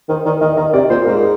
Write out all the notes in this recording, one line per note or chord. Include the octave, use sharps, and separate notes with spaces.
D#3 C5
D#3 D5
D#3 D#5
D#3 D#5
C3 D5
A#2 C5
G#2 A#4